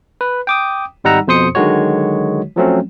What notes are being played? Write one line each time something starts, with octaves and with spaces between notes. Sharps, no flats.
B4
G5 D6 D#6
G#1 G3 D#4 F#5 A#5 E6
F2 B2 C5 C6 D#6 C#7
D3 D#3 F#3 G#3 F#4 C#5
F3 F#3 A3 C4 C#4